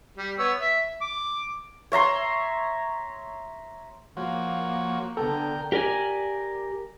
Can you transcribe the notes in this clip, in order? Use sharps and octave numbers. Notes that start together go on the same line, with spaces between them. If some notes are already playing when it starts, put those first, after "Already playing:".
G3
B3 C#5 E6
E5
D6
C#5 E5 A#5 C6
F3 A#3 F#4 C#5
D3 B3 A4 A#4 G5
G4 A#4 D5 G#5